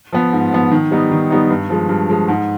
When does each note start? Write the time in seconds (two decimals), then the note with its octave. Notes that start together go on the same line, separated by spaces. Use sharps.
0.13 F3 B3
0.33 G#2
0.52 F3 B3
0.72 D#3
0.91 G3 B3 D#4
1.11 D#3
1.30 G3 B3 D#4
1.50 G2
1.70 F3 G#3
1.89 G2
2.09 F3 G#3
2.28 G#2